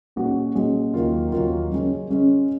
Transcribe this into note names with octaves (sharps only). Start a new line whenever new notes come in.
A#2 G#3 C#4 F#4
A#2 G#3 C#4 F#4
D#2 D#3 F#3 A#3 F4
D#2 D#3 F#3 A#3 F4
C#3 G#3 C#4
C#3 G#3 C#4